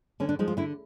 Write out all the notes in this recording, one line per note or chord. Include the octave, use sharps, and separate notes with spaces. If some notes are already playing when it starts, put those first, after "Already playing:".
D3 C#4
D4
F3 G#3 D#4
F4
D3 E4